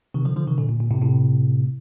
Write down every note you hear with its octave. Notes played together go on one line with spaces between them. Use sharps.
C3 D#3
D3 F3
D3 F3
C3 D#3
A#2 D3
A#2
A#2
A2 C3
A2 C3